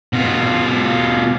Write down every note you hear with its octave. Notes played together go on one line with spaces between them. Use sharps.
B2 F4